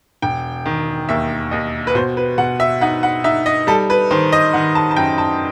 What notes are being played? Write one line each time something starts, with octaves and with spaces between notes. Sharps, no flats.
E1 G5
D#3
D#2 E5
D#2 D#5
B4
B2 C5
B4
B2 F#5
E5
D#4 F#5
F#5
D#4 E5
D#5
G3 A4
B4
D#3 C5
D#5
D#3 F#5
A5
A5
F#2 G5
A5